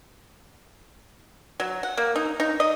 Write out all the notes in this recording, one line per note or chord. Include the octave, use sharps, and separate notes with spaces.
F#3
F#5
A#3
D#4
D#4
D#5